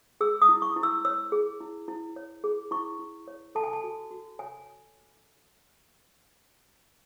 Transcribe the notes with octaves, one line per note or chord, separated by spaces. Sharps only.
G#4 E6
D#6
E4
C#6
E4
E6
C#5 E6
G#4
E4
E4
C#5
G#4
E4 C#6
E4
C#5
A4 A5
G#5
A5
F#4
F#4
C#5 G#5